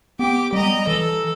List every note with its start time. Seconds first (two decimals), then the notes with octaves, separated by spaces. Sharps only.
0.19 B3 G4 D6
0.53 G3 D#5 A#5
0.87 E3 A4